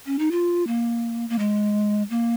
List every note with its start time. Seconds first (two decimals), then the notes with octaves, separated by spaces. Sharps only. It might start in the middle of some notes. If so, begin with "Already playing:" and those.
0.06 C#4
0.19 D#4
0.31 F4
0.67 A#3
1.29 A#3
1.39 G#3
2.10 A#3